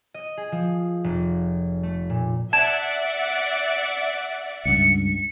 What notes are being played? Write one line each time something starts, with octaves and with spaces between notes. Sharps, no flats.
D#5
G#4
F3
F1
A3
A#2
D5 E5 F#5 A5 G#6 E7
C#2 G2 C#7